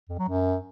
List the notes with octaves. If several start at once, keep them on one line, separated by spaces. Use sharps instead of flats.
F2
F#3
F#2